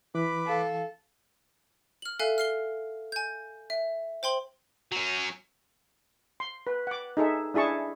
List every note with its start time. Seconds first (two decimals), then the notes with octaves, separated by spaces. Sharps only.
0.15 E3 B4 B5 D6
0.47 A4 F5
2.02 F6 F#7
2.19 A4 E5 F5 G#5 F#6
2.38 F6 C7 G7
3.12 G#5 G6
3.70 E5
4.23 C5 G5 C6 F#7
4.92 F#3 C#4
6.40 C6
6.67 B4
6.87 F#5 D6
7.17 D#4 G#4 A4 E5
7.54 D4 E4 G#4 A5 C#6